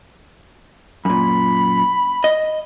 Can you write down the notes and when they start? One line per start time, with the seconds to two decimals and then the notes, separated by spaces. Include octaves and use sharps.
1.05 F#2 A#2 B5
2.24 D#5